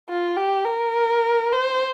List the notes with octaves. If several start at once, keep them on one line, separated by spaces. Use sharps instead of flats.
F4
G4
A#4
C5